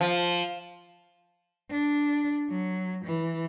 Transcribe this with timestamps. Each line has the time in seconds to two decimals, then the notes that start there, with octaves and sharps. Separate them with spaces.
0.01 F3
1.70 D4
2.50 F#3
3.05 E3